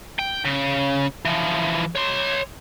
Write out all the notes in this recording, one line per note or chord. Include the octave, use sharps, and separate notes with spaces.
G5
C#3
E3 F3
C#5 C6